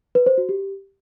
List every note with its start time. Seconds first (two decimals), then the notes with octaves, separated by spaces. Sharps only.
0.15 B4
0.26 C5
0.38 F#4
0.49 G4